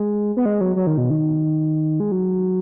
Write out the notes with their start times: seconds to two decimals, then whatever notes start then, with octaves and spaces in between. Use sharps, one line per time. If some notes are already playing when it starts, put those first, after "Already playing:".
Already playing: G#3
0.37 B3
0.46 G#3
0.61 F#3
0.76 F#3
0.87 D#3
0.97 B2
1.10 D#3
2.00 G#3
2.12 F#3